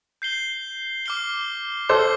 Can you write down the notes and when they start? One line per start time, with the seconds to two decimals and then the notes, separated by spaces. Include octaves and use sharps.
0.22 G6 C7 G7
1.06 D6 F6 C7 G7
1.89 A4 C5 D6 F6 C7 G7